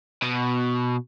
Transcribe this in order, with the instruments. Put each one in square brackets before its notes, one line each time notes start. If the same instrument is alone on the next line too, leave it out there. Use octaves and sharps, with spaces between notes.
[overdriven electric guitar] B2